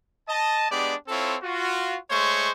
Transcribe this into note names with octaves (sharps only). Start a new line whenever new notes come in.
D#5 A5
G#3 B3 D4 G4 D5
C4 E4 F4 A4 C#5
F4 F#4
G#3 A3 C5 C#5 C#6